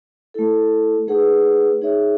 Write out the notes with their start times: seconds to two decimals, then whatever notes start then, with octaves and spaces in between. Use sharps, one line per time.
0.34 A3 E4 A4
1.08 A3 D#4 G#4 B4 F#5
1.82 D#4 G#4 C#5 E5